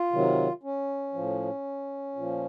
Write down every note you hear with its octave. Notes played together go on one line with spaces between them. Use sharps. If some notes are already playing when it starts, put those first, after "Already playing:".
Already playing: F4
C3 D#3 F#3
C#4
A2 F3
A#2 F3